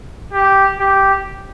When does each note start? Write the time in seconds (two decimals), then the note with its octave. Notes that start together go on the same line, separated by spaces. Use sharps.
0.33 G4
0.79 G4